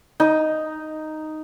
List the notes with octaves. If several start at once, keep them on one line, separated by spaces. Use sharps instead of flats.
D#4